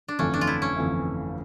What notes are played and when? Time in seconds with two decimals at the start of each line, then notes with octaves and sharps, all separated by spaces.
0.08 D4
0.19 G1 F2 E3 A3 C#4
0.34 D4
0.41 F4
0.47 E4
0.62 C#4
0.76 G1 F2 E3 A3